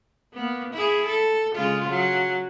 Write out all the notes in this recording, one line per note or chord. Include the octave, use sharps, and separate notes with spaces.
A#3 B3
E4 G#4
A4
C#3 G#3 F4
F#3